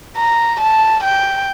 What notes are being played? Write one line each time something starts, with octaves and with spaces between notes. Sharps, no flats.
A#5
A5
G5